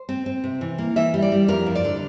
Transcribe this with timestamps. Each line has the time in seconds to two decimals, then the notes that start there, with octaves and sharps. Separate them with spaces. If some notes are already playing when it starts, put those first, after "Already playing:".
Already playing: C5
0.09 C4
0.26 C4
0.44 C3
0.61 E3
0.78 A#3
0.96 E3 E5
1.14 G3
1.22 D5
1.32 G3
1.48 F2 A#4
1.66 F3
1.75 D5
1.85 D3